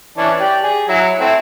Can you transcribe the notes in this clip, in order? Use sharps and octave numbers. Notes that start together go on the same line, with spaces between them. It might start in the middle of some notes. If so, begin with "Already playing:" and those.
E3 C#4 D4
G4 D5
G#4
F#3 E4
A3 C4 E4